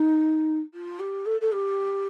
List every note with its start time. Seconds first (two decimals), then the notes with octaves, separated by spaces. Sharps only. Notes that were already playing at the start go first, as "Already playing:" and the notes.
Already playing: D#4
0.74 F4
0.99 G4
1.26 A4
1.41 A4
1.52 G4